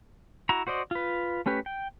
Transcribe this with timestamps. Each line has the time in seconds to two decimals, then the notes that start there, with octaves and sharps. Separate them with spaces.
0.49 E4 F#4 A#5
0.67 F#4 C5 D5 D#5
0.91 F4 B4
1.46 A3 C#4 G4 B4
1.66 G5